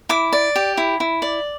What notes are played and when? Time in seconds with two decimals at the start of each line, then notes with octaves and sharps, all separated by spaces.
0.09 E4 D6
0.32 D5
0.56 G4
0.77 E4
1.00 E4
1.22 D5